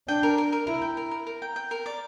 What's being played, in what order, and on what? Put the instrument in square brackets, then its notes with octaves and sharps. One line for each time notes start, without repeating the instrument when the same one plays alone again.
[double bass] D4 [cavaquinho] G5
[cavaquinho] A#4
A#4
A#4
[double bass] E4 [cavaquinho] A#4
[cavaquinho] G5
A#4
A#4
A#4
G5
G5
A#4
D5